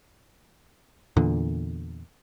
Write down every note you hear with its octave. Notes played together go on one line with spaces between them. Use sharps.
E2 A#2 D3